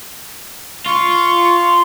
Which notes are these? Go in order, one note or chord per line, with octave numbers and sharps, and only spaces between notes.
F4 C#6